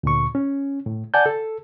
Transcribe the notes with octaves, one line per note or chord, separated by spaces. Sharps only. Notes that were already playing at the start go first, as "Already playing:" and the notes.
D2 A#2 C#6
C#4
A2
D5 F#5 G#5 A5 G6
A4